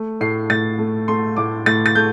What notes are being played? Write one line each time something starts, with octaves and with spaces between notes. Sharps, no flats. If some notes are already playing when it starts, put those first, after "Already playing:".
Already playing: A3
A2 C7
A2 A6
A3
A3 C6
A2 D6
A2 A6
A6
A3 G6